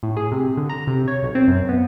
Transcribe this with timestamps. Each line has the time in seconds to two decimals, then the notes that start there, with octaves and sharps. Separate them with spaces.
0.03 A2
0.17 G#4
0.32 C3
0.57 D3
0.70 A#5
0.87 C3
1.08 C#5
1.23 B1
1.35 C4
1.48 F#2
1.69 B3